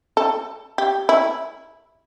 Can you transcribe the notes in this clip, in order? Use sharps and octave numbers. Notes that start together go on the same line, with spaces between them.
A4
G4
E4